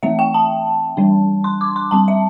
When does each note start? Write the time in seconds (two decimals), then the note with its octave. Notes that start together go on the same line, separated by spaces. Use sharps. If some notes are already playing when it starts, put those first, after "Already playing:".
0.03 E3 A3 C4 E5
0.19 G5
0.34 A5
0.97 E3 G3 D4
1.44 C6
1.61 D6
1.76 C6
1.91 G3 C4 A5
2.08 E5